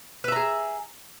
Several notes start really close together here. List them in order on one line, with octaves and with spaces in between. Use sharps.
B4 E5 A#5 G#4